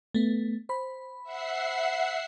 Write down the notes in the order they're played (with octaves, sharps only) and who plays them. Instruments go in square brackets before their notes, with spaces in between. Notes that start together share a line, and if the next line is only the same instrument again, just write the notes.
[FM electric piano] A3 B3
C5 B5
[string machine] E5 F#5 C7